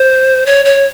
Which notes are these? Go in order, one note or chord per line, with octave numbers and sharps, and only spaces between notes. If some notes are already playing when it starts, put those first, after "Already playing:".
Already playing: C5
C#5
C#5